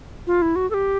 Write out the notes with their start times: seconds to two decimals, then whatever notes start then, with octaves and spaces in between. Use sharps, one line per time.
0.27 F4
0.42 E4
0.56 F#4
0.70 A4
0.74 G4